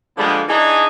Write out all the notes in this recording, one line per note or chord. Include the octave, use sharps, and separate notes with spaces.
D3 F3 G3 G#3 A#3 B3
E3 D4 D#4 G#4